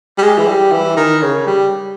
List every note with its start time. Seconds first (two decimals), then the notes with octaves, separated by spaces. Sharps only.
0.18 G3
0.22 G#3
0.38 E3
0.48 G3
0.72 E3
0.97 D#3
1.22 C#3
1.47 G3